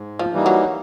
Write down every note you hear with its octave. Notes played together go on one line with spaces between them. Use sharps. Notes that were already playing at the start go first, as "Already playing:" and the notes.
Already playing: G#2
F3
E3 G3 A#3 D#4
F#3